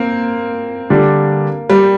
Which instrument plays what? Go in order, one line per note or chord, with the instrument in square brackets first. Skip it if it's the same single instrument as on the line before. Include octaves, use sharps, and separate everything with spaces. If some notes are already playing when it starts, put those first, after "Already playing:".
Already playing: [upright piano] A#3 C4
[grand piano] D3 G3 D4
[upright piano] G3